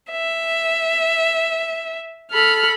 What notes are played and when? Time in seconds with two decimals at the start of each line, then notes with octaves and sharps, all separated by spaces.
0.10 E5
2.32 A4 B5 F6